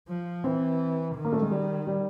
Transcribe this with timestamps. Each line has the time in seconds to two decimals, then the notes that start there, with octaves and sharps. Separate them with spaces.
0.08 F3
0.44 E3 C4
1.15 D#3
1.25 A#3
1.33 A3
1.42 G#3
1.51 G3
1.87 G3